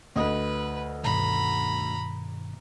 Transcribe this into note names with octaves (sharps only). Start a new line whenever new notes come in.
D2 B4 D#5 D#6
G2 B2 D#3 A#5 B5